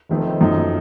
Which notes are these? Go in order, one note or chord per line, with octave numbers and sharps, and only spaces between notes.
F1 F2 D#3 A3 C4
F#2 F3 A3 D#4